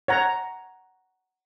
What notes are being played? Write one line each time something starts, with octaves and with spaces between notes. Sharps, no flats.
C#5 F#5 A#5